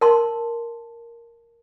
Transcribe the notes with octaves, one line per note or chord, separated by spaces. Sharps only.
A#4 A5 C6